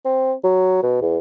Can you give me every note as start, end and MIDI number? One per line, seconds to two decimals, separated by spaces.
0.05 0.33 60
0.44 0.82 54
0.83 1.01 47
1.01 1.19 40